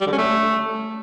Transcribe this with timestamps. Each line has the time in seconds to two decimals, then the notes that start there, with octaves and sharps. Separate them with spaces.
0.01 G3
0.07 D3
0.12 C#4
0.18 A3